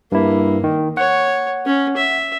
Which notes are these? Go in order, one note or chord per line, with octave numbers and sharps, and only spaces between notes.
G2 A#3 E4
D#3
C#5 F#5
C#4
E5